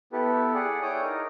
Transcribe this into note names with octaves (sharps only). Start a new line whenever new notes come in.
B3 E4 G4 A4 B4
G#4 D5 F#5
E4 C#5 G5 D6 D#6
D#4 A#4